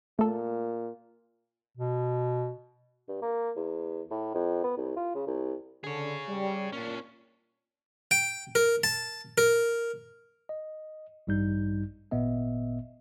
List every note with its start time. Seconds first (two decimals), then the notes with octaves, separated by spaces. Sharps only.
0.19 A#2 A3 A4
1.77 B2
3.08 G2
3.22 A#3
3.56 E2
4.11 A2
4.34 F2
4.64 B3
4.77 C2
4.97 F4
5.15 C#3
5.27 C2
5.84 D3 G#4 C#5
6.29 G3
6.73 A#2 C#4 D4
8.11 G5
8.55 A#4
8.84 A5
9.38 A#4
10.49 D#5
11.27 A1 G2 G3 D#4 G6
12.11 G#1 A#2 B3 D#5 E5